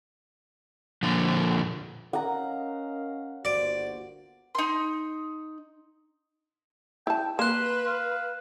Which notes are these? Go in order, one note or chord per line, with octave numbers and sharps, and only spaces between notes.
A#2 D3 F3
C#4 A#4 D#5 F5 F#5 A#5
G1 A#3 F#4 C5 D5
D#4 C6
E4 G5 A5
A#3 B4 C6 F#6 E7
F5